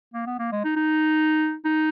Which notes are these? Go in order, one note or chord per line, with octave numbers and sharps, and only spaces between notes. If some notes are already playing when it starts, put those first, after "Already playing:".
A#3
B3
A#3
G#3
D#4
D#4
D#4